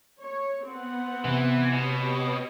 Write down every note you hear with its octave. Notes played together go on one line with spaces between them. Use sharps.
C#5
B3 C4 F#5
C3 E3
B2 G4 C#5